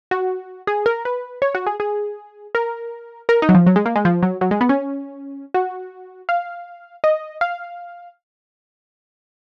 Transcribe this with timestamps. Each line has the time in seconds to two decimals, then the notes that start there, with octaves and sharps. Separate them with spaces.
0.11 F#4
0.67 G#4
0.86 A#4
1.05 B4
1.42 C#5
1.55 F#4
1.67 G#4
1.80 G#4
2.55 A#4
3.29 A#4
3.42 D#4
3.49 F#3
3.55 F3
3.66 F#3
3.76 G#3
3.86 A#3
3.96 G#3
4.05 F3
4.23 F#3
4.41 F#3
4.51 G#3
4.61 B3
4.69 C#4
5.54 F#4
6.29 F5
7.04 D#5
7.41 F5